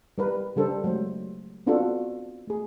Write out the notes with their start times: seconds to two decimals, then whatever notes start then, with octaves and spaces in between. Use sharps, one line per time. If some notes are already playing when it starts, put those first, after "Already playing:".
0.18 G3 A#4 B4
0.56 C#3 G3 D4 A4 A#4 C5
0.84 F#3 G#3 A3 C5
1.67 B3 C4 D4 F4 F#4 A4
2.47 A3 G#4